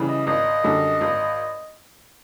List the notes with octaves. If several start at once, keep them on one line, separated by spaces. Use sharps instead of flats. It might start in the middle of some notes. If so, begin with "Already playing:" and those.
Already playing: C#3 E3 G3
D#5
G#1 D#5
F#2 D3 G3
G#1